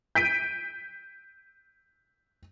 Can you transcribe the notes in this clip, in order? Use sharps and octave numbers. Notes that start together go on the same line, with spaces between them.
G6 B6 D7 D#7